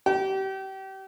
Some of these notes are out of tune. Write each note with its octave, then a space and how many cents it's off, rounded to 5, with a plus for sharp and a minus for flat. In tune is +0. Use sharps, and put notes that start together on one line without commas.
G4 -30